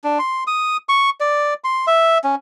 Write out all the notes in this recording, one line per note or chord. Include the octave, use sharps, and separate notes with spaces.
D4
C6
D#6
C#6
D5
C6
E5
C#4